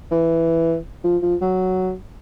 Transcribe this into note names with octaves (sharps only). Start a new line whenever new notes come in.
E3
F3
F3
F#3